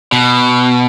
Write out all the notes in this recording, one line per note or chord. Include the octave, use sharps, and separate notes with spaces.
B2